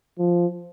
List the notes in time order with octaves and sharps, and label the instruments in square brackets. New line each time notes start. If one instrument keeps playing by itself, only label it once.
[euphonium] F3